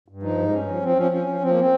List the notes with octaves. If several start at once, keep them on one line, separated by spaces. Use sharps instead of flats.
G2
F3 D#4
G#2
G2 C#4
F3
F3 C4
F3 C#4
F3 C#4
F3
F3 C4
A#3
C4